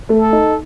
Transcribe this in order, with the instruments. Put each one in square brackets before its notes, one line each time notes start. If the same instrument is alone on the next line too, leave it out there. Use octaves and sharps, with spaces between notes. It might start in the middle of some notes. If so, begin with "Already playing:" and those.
[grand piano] A3
[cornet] A4
[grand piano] D#4